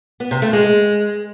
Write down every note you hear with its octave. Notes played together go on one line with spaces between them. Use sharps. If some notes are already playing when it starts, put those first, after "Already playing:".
B3
C3
A3
G#3